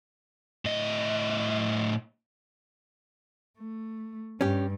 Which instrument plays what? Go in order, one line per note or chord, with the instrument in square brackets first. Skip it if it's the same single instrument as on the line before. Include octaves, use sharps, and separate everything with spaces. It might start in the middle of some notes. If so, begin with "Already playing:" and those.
[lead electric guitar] A2 D#5
[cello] A3
[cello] G2 [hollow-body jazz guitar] C#4 G4